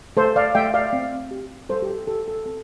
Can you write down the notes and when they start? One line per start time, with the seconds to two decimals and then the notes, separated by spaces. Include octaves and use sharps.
0.17 A3 A4 C5
0.36 D5 F5
0.55 A3 E5 G5
0.74 D5 F5
0.93 C4
1.31 G4
1.69 G3 A4 C5
1.82 G4
1.89 A4
2.07 G4 A4
2.28 A4
2.46 C4 A4